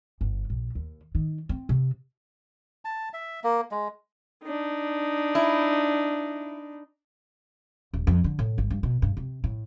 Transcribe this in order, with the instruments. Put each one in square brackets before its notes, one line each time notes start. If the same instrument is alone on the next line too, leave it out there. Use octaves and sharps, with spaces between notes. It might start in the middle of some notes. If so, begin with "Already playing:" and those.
[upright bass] G1
A#1
D#2
D#3
C4
C3
[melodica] A5
E5
A#3
G#3
[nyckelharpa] D4 D#4
[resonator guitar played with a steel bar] E4
[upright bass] D#1
F2
D3
A2
G#1
G2
B2
G2
C3
A2